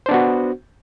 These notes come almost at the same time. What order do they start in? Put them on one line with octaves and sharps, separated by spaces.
C5 D4 B3 F#4